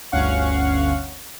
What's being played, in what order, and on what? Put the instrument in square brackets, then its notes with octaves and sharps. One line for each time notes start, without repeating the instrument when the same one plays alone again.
[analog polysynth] G1 D2 C#4 F5 F#5 C#6